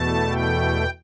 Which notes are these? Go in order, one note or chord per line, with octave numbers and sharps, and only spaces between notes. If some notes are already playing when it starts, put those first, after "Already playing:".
Already playing: E2 B2 A3 A5
G5